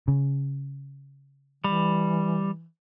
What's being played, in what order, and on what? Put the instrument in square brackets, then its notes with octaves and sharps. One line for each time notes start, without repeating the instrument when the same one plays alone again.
[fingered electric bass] C#3
[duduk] E3 [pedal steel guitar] G3